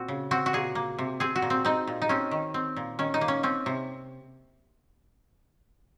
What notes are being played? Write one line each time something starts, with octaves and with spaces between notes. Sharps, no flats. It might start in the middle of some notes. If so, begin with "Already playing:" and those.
Already playing: A#2 C4 F#4
C#3
C4 F#4
F#4
A#2 G#4
A#3
C3
C4 G#4
F#4
A#2
C4
C4 D#4
A#2
D#4
C4 C#4
D#3
C4
A#2
D#3 C#4
D#4
A#3
C#4
C4 C#4
C3